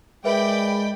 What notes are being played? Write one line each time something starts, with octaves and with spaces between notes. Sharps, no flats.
G#3 A#4 B4 D5 E5 G5 B5